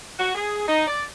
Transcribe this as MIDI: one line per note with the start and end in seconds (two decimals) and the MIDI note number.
0.19 0.34 66
0.35 0.66 68
0.68 0.87 63
0.87 1.04 74